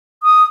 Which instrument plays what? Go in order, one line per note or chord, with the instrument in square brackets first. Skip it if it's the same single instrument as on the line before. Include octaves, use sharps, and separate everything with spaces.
[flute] D#6